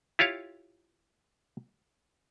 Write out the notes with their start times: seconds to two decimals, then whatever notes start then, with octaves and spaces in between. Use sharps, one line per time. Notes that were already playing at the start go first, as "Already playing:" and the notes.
0.19 E4 F4 G4 C#5 F5